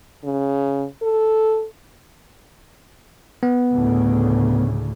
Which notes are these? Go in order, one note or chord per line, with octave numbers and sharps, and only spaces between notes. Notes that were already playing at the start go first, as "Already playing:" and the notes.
C#3
A4
B3
D2 A2 C#3